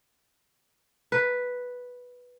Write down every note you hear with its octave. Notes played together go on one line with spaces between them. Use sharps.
B4